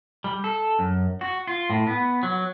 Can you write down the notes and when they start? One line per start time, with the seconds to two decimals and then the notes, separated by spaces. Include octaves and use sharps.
0.24 G3
0.44 A4
0.79 F#2
1.21 F#4
1.47 F4
1.70 A2
1.87 B3
2.23 F#3